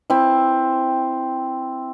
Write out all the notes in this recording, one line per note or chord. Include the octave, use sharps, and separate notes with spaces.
C4 E4